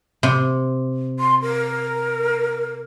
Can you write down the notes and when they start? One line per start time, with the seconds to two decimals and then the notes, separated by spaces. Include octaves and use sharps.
0.23 C3
1.19 C6
1.42 A#4